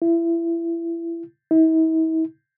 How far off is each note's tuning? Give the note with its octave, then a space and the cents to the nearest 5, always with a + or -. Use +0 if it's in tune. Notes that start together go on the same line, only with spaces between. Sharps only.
E4 +25
E4 -45